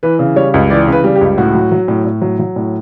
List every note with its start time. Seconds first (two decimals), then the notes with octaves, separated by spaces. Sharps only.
0.03 E3 B4
0.19 C#3
0.36 G3 C#5
0.54 C#2
0.70 E3 D5
0.88 C#3 B4
1.04 G3
1.16 G4
1.21 C#2
1.38 A2 F#4
1.55 F#3
1.72 F#3
1.88 A2
2.04 A2
2.22 F#3
2.39 F#3
2.56 A2